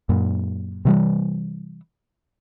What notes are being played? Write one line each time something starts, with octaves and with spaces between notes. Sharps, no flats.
F#2 A#2
C3 E3 G3